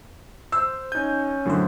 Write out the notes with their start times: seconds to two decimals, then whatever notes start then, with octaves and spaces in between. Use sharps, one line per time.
0.52 C5 E6
0.92 C#4 D#4 G#5 G6
1.46 F#2 A2 D3 C5